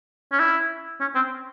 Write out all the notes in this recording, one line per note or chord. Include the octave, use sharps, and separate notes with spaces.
C#4
E4
C#4
C4